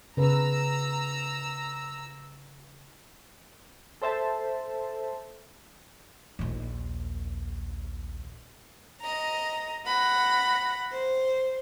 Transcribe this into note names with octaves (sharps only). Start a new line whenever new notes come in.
C#3 B4 A#5 E6
A4 C5 E5 A5
A#1 D#2
D#5 A#5
F#5 B5 A#6
C5